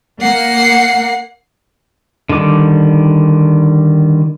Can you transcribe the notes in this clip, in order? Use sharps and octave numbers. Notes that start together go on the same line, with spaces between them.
A#3 F#5 C7
D3 D#3 G3 D6